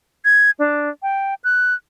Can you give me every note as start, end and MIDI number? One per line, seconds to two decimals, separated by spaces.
0.25 0.51 92
0.59 0.89 62
1.03 1.35 79
1.44 1.74 90